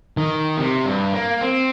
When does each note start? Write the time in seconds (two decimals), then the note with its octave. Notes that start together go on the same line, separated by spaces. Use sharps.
0.17 D#3
0.59 C3
0.86 G2
1.14 A#3
1.42 C4